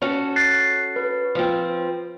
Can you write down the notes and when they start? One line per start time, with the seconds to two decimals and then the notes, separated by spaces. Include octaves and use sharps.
0.02 C#4 F#4 A4
0.36 F#6 A6 C7
0.96 B4
1.35 F3 C4